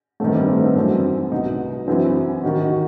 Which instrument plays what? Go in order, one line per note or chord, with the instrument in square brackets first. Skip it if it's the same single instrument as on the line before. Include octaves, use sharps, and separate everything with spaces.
[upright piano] G2 D#3 A3 C4
G3 B3
A3 C4
B3 D#4
F#2 E3 A3 C4
C2 B2 B3 D#4
F#2 E3 C4 E4
D#2 D#3 D#4 F#4
D#4 F#4